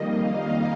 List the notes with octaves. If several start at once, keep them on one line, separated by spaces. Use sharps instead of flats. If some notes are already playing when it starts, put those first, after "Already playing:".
Already playing: F2 D#3 G3 A#3 D#5
F5